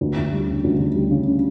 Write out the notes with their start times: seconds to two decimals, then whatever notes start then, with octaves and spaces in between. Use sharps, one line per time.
0.01 D2
0.17 D2
0.33 G3
0.48 C#3
0.64 D2
0.80 D2
0.96 G3
1.11 C#3